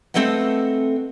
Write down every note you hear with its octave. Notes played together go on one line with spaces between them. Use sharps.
A3 C4 A4 B4 D#5 F#5